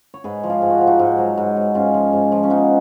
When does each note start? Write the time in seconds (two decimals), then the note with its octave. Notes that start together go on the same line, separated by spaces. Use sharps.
0.14 C#5
0.24 G#2 G#4 B4
0.43 F3
0.49 F4 G#4
0.62 G#2 G#4
0.70 F#4
0.79 F3 F4
0.87 D#4 F#4
0.99 G#2
1.18 F#3
1.38 G#2
1.57 F#3
1.74 G#2 C#4 F4
1.94 F3
2.13 G#2
2.32 F3
2.43 C#4
2.50 G#2 B3 D#4